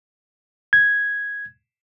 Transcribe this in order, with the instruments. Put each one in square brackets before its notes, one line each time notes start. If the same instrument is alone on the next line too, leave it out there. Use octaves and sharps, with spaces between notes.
[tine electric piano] G#6